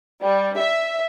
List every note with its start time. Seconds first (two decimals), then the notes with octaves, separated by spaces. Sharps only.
0.21 G3
0.56 E5